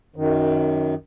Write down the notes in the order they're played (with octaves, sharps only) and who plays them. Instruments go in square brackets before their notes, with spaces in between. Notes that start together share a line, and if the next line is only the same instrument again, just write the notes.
[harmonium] F#2 D#3